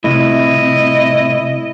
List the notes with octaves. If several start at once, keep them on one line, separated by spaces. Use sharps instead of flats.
A2 C3 E4 D#5